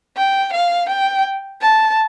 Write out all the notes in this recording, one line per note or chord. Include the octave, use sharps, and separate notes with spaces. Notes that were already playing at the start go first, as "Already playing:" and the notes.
G5
F5
G5
A5